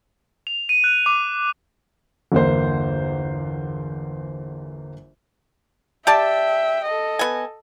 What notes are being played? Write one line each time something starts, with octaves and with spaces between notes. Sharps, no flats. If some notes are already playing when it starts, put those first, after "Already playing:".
F7
D#7
F#6
D6
G1 E2 A#3 C5
G4 D5 E5 G5 A5
A4 D#5
B3 G#5